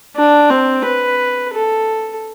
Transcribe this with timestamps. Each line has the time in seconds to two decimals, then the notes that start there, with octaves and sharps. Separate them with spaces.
0.16 D4
0.50 C4
0.85 B4
1.53 A4